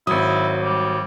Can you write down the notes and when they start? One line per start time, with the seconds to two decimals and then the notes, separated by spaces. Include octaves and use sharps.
0.07 G#1 F#3 E4 D#6
0.63 G3